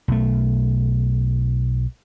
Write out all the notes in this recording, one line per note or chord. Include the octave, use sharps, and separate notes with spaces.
B1 A3